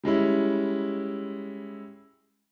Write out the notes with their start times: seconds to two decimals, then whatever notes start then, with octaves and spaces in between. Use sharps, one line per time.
0.03 G3 G#3 C#4 E4